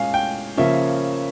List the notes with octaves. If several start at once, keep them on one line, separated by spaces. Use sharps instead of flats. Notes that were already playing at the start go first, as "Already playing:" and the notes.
Already playing: A#2 G#3 C#4 F5 G#5
G5
C#3 F3 A#3 C#4 E5